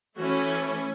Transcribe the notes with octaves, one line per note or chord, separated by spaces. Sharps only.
E3 A3 C#4 F#4